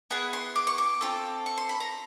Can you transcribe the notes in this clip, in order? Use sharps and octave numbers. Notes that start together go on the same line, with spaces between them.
B3 E4 G#4 F#5
C6
D6
C#6
D6
C4 F4 A4
C#6
C6
B5
A#5